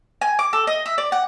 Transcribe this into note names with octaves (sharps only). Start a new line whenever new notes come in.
G#5
D6
A4
D#5
E5
D5
F#5